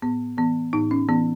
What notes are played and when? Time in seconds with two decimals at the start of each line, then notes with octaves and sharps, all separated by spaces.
0.02 A2 B3
0.38 E3 B3
0.73 A2 D#4
0.91 C#4
1.08 E3 B3